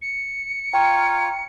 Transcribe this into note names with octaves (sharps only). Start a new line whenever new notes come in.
C#7
F4 C#5 F5 G5 A#5